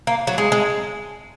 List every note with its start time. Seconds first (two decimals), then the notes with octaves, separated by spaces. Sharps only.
0.07 A#3
0.27 F#3
0.38 G#3
0.52 G#3